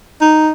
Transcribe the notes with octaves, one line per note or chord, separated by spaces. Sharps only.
D#4